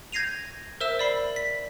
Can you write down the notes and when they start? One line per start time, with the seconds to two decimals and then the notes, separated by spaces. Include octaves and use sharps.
0.12 G6 G#6 A#6 C7 D#7 F7
0.81 A#4 C5 E5 E6 E7
0.99 D5 B5 C7
1.36 B6